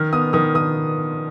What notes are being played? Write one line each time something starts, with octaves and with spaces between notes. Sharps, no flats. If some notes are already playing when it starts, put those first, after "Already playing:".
Already playing: D#3 F6
B3 D#6
D#3 D#6
D#3 D#6